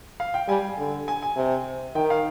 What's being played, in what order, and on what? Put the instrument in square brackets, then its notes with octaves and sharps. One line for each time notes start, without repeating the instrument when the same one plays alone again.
[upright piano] F5
G5
[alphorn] G3 [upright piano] G#5
[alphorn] D3
[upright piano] G#5
G#5
[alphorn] C3
[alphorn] D#3 [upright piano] G5
[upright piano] F5